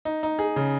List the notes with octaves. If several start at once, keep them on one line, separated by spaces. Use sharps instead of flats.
D#4
D#4
G#4
C#3